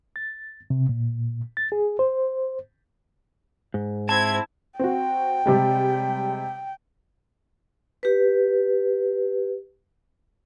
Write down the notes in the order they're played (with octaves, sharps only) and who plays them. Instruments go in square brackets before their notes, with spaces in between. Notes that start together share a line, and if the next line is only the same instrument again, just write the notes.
[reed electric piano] A6
C3
A#2
A6
G#4
C5
[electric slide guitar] G#2
[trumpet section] C4 E4 [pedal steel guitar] A5 [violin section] G#6
[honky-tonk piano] C4 F#4 [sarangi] G5
[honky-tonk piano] C3 G3 G#3
[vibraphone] G4 B4